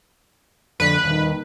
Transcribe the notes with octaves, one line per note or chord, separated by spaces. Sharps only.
F2 D3 B4
D#1 D#3